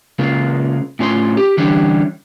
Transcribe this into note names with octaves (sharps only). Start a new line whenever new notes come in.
C#3 G#3 A#3 F4
A2 C#4 F4 C#5 C6
G4
D3 E3 G3 C#4 D4 G4